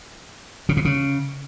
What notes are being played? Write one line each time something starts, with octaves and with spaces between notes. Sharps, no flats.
C#3
C3
C#3